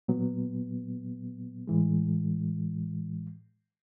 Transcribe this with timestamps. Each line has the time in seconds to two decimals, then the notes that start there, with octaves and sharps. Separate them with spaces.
0.08 A#2 F#3 B3
1.67 A2 E3 G#3